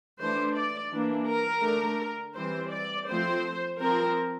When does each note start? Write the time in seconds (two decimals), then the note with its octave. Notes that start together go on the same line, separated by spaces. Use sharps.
0.19 E3 A3 D4 C5
0.55 D5
0.91 E3 A#3 D4
1.27 A#4
1.63 D3 A3 D4
2.36 E3 G3 C4 C5
2.71 D5
3.08 F3 A3 C4 C5
3.80 F3 C4 A#4